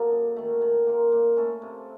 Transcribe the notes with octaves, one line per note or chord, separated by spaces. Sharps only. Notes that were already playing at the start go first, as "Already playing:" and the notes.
Already playing: F#3 A#3 D#4 A4
F#2
D#3 A3
D#3
A#3 F4 A#4
A#2
A3 C#4 A4
C3